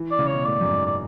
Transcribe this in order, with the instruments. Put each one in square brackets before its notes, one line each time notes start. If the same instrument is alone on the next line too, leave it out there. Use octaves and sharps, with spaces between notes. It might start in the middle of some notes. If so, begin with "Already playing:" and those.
Already playing: [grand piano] E3
[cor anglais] D5
[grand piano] C#3
[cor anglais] C#5
[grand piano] B2
[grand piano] A2 [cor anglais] D5
[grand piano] F#2
G#2
[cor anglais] D5